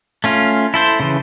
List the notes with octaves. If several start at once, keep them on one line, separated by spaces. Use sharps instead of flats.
A3 C#4 F4
E4 A4 C5
C#3 E3